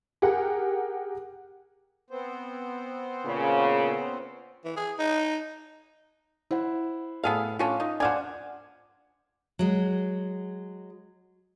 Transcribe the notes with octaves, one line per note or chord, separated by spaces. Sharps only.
G4 G#4 A#4 F#5
B3 C4 C5
A#2 C#3
E3
G#4
D#4
E4 C5 F#5
A2 B3 G#4 A4 F5
F3 C#4 D4 F4
D#4
D4 C5 F5 F#5 G#5 D6
F#3 G#3